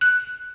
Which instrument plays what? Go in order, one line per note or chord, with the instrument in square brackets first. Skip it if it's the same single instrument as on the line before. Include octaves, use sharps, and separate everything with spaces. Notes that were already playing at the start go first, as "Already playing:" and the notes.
[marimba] F#6